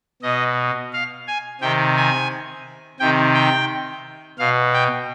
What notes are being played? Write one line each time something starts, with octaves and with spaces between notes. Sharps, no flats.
B2 D#5
F5
G#5
C3 D#3 G5
G#5
C3 D#3 G5
G5
B2 F5
G5